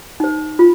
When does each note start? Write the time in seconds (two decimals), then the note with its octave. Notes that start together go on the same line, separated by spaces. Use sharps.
0.20 D#4 C5
0.59 F4